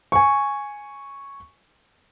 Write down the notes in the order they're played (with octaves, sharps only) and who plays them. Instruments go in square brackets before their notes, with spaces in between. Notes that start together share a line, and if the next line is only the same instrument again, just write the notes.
[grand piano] G#5 C#6